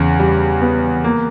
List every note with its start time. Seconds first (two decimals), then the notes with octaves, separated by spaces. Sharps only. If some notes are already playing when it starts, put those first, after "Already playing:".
Already playing: E2 C#3
0.19 G3
0.61 B3
1.04 A#3